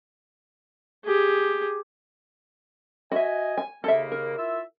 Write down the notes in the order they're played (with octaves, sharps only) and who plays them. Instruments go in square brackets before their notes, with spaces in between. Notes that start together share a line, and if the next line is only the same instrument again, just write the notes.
[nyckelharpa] G4 G#4
[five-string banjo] F#4 E5 [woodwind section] D#5 G#5
[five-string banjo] G#5
[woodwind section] D#2 C#3 A#3 [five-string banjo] A4 E5
[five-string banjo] A#4
[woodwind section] E4 F4 E5